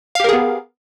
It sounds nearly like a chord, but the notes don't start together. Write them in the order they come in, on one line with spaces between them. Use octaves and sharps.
F5 G4 A#4 G#4 B3